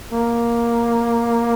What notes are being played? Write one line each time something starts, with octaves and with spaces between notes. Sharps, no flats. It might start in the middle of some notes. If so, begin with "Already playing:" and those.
A#3